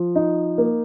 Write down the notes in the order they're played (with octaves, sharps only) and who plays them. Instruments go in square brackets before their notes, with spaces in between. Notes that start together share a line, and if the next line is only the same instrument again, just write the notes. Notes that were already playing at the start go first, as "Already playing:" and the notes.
Already playing: [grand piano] F3
D#4
A#3